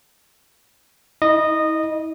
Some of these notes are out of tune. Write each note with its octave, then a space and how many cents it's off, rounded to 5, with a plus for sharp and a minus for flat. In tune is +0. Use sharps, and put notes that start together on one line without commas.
E4 -45 D#5 -15